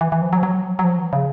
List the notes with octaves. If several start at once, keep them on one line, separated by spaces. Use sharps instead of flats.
E3
E3
F3
F#3
F3
F#3
F#3
F3
E3
C#3